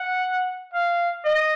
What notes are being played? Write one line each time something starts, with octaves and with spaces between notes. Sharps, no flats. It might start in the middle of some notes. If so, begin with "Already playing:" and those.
Already playing: F#5
F5
D#5